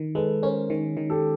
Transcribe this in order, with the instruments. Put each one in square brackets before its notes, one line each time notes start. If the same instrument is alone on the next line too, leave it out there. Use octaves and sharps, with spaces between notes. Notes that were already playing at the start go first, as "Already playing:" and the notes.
Already playing: [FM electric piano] D#3
[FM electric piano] G#3 [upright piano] A4 B4
[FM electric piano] C#4 [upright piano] A#4 C5
[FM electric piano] D#3
D#3
[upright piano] G4 A4